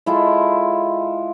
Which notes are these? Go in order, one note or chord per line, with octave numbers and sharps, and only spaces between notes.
G#3 E4 F4 A4